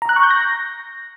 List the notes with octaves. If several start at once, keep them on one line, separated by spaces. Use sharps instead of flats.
A#5
F#6
C#6
G6
A#6